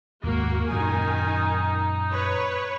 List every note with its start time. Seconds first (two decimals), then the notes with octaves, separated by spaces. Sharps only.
0.24 D#2 G#2 G#3 A#3 F#4
0.71 F#2 A#2 D#3 F#3 D#4 G#5
2.10 B4 C#5